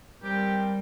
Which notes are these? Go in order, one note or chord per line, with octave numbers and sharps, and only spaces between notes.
G3 C4 G4 A#4 G5